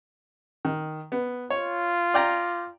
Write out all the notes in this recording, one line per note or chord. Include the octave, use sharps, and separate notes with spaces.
D#3
B3
F4 C#5
D5 G5 A#5